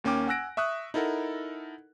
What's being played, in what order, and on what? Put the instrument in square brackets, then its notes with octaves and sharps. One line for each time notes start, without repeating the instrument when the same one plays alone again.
[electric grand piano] D#2 A#3 C#4 G5 D6
F#5 G#5 E6 F#6 A#6 D7
E5 C#6 D#6 F#6
D#4 E4 A4 A#4 F#5